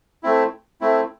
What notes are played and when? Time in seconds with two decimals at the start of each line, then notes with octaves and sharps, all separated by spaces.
0.23 A3 C4 E4
0.81 A3 C4 E4